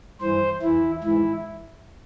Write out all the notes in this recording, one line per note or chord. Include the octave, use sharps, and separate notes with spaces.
G2 E3 C5
E2 E3 E4
G#2 E3 E4